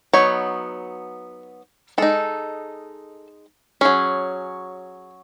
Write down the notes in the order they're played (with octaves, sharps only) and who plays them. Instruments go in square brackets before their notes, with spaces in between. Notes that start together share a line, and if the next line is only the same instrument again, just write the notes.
[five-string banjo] F#3 B3 D#4 C#5
G#3 D#4 A4
F#3 C#4 G#4